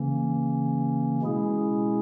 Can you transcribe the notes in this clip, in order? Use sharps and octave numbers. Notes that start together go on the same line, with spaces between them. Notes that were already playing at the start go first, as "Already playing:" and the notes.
Already playing: C#3 E3 A#3 C#4
B2 G#3 C#4 E4 G#4